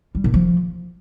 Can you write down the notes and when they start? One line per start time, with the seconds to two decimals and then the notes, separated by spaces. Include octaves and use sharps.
0.15 G3
0.24 A#2
0.34 F3